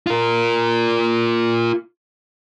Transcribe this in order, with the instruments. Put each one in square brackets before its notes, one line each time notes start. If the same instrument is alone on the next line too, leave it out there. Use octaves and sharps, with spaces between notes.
[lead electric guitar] F4 A#4